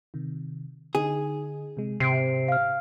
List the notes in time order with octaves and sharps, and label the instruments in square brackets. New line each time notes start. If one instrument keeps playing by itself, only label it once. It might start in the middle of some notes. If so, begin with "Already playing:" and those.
[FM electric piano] C3 D#3
[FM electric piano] D3 D#4 [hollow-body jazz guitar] G#4
[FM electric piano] C3 G#3
[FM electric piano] G#2 [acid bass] C3 [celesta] C7 D7
[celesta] F5 F6